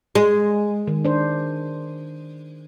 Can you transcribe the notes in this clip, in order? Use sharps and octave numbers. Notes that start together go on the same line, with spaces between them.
G#3
D#3
D4 C5